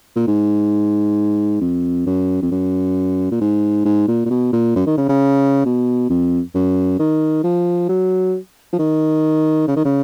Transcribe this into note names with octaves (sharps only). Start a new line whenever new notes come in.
A#2
G#2
F2
F#2
F2
F#2
A#2
G#2
G#2
A#2
A#2
B2
A#2
F#2
D#3
C#3
C#3
B2
F2
F#2
D#3
F3
F#3
F3
D#3
C#3
D#3
C#3